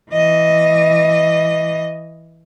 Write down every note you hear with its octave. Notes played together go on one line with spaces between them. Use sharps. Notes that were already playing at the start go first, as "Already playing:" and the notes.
E3 D#5